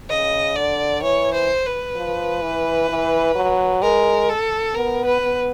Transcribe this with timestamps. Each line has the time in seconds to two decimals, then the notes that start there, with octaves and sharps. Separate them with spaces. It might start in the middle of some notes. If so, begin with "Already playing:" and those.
0.09 C#3 D#5
0.56 D3 D5
1.02 E3 C#5
1.33 C5
1.65 B4
1.95 F3
2.42 E3
2.89 E3
3.35 F#3
3.82 G#3 A#4
4.29 A4
4.74 B3 A#4
5.05 B4
5.21 B3